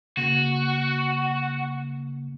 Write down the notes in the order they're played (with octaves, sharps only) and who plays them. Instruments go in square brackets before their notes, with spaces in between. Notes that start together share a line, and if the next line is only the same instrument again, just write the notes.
[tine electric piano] C#3 A#3 [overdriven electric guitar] F#4